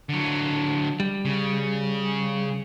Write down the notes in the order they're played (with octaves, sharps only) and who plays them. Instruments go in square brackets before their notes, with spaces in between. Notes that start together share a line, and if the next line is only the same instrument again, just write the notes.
[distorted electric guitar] D3 F#3
[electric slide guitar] G3
[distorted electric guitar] C#3